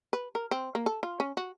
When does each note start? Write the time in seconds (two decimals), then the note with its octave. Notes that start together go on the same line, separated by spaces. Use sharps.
0.13 B4
0.35 A#4
0.51 C4
0.75 A#3
0.86 A4
1.03 F4
1.20 C#4
1.37 F#4